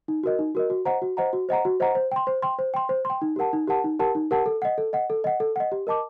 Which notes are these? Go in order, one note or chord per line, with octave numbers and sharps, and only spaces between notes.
D#4
F#4 A#4 D#5
D#4
F#4 A#4 D#5
F#4
C5 D#5 F#5 A#5
F#4
C5 D#5 F#5 A#5
F#4
C5 D#5 F#5 A#5
F#4
C5 D#5 F#5 A#5
C5
G5 C6
C5
G5 C6
C5
G5 C6
C5
G5 C6
D#4
G4 A#4 F#5 A5
D#4
G4 A#4 F#5 A5
D#4
G4 A#4 F#5 A5
D#4
G4 A#4 F#5 A5
A4
D#5 F#5
A4
D#5 F#5
A4
D#5 F#5
A4
D#5 F#5
G4
A#4 D#5 A5 D6